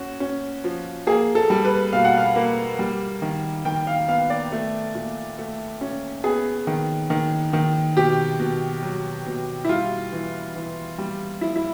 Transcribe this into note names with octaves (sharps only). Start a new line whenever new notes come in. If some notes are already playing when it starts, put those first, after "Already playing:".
Already playing: C#4 F#4
C#4
F3
A#3 G#4
A4
G3
B4
B2 F5
F#5
F5
A#3
G3
D#3
D#3 G5
F5
B3 F5
D5
A3
A#2
A3
C#4
B3 G#4
D#3
D#3
D#3
B2 G4
B2
F#3
B2
E4
G3 F4
E3
E3
G3
F3 E4
E4